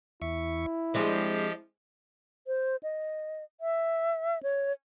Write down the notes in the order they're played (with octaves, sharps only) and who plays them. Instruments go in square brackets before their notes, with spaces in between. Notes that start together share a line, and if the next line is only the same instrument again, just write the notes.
[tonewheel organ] E2 E5 C#6 [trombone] E4
[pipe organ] F3 G4 [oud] G#3 C4 D4 [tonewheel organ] D#5
[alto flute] C5
D#5
E5
C#5